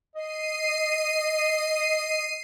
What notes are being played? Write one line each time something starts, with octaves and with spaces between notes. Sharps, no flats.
D#5 C7 D#7